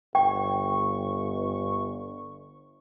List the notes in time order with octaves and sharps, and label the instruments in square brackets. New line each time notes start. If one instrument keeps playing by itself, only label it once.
[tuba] G1 [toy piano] G5 [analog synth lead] C#6